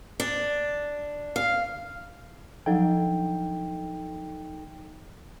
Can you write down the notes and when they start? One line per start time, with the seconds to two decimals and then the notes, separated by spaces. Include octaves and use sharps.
0.20 D4
1.36 F5
2.66 F3 F#3 D4 D#4 A4 G5